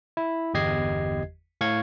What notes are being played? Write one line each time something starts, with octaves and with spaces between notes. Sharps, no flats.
E4
G1 E2 G4 D#5 G#6 C7
A2 F5 C#6 G#6